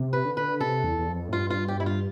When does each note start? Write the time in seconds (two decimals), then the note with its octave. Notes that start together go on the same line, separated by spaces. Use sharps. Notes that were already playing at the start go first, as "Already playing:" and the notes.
Already playing: C3
0.13 B4
0.25 D3
0.37 B4
0.60 C3 A4
0.84 E2
0.99 E2
1.08 F2
1.29 A2
1.32 G2 F4
1.50 F4
1.68 G4
1.80 E4
1.86 F4